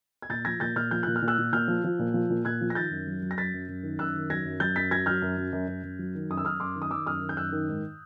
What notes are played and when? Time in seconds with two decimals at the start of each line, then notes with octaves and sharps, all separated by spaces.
0.22 G#6
0.29 A#2 G6 A6
0.45 F3 G#6 A#6
0.60 A#2 G6 A6
0.76 A#2 F6 G6
0.91 F3 G6
1.03 A#2 F#6
1.16 F6
1.22 A#2
1.28 E6 F#6
1.38 A#2
1.52 A#2 F6 G6
1.68 F3
1.84 F3
1.99 A#2
2.14 F3
2.30 A#2
2.45 A#2 F#6 G#6
2.61 F3
2.70 A#6
2.75 D#3 G6 A6
2.91 F#2
3.07 F#3
3.22 F#3
3.31 A#6
3.38 F#2 A6 B6
3.53 F#2
3.68 F#2
3.83 D#3
3.99 F#2 E6 F#6
4.15 D#3
4.30 F#3 G#6 A#6
4.45 F#2
4.60 F#3 G6 A6
4.76 F#2 A6 B6
4.91 F#3 G#6 A#6
5.06 F#3 F6 G6
5.22 F#2
5.37 F#2
5.52 F#2
5.68 F#2
5.83 F#2
5.99 F#3
6.15 D#3
6.30 F#2 D#6
6.37 E6
6.45 F#2 D#6 F6
6.60 F#2 C6 D6
6.76 D#3
6.82 D#6
6.91 D#3 D6 E6
7.06 F#2 D#6 F6
7.22 D#3
7.29 G6
7.37 F#2 E6 F#6
7.52 D#3
7.69 G#2